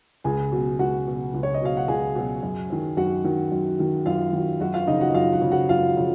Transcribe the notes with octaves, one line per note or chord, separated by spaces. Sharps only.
C#2 G#4 G#5
B2 F#3
C#2 F#4 F#5
B2 F#3
C#2
C#5
D#5
B2 F#3 F5
F#5
C#2 G#4 G#5
B2 F#3
F#2
D#3 F#3
F#2 F#4 F#5
D#3 F#3
F#2
D#3 F#3
F#2 F4 F5
D#3 F#3
F#2 F#4 F#5
F4 F5
C#3 F3 D#4 D#5
F#4 F#5
D#5
F#2 F4 F5
F#4 F#5
C#3 F3
F#4 F#5
F#2 F4 F5
C#3 F3